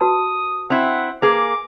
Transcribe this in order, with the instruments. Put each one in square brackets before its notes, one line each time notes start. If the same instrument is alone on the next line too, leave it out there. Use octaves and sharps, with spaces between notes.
[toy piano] F#4 B4 A5 [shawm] D#6
[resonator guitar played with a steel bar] C4 E4 [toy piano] E5 [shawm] F#5
[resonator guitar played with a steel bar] A#3 G#4 [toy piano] B4 [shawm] D6